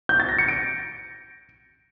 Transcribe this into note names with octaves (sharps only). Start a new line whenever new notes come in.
G6
A6
A#6
C#7
D7